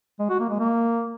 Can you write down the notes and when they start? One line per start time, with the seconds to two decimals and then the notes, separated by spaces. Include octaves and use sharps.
0.20 G#3
0.29 F#4
0.39 A#3
0.49 G#3
0.59 A#3